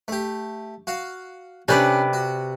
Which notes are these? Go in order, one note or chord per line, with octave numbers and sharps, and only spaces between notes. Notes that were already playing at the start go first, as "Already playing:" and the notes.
A3 G4
F#4 F5
C3 C#4 D4 G4 B4 D5
F#4